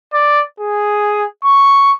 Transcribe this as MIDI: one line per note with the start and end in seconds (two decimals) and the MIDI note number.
0.13 0.43 74
0.60 1.24 68
1.44 1.93 85